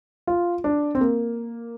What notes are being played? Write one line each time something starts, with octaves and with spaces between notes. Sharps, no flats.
F4
D4
C4
A#3